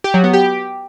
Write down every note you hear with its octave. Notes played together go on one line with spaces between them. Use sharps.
G4
F#3
B3
G4